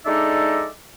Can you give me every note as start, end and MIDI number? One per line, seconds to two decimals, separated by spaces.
0.06 0.66 56
0.06 0.66 62
0.06 0.66 63
0.06 0.66 69
0.06 0.66 74
0.06 0.66 76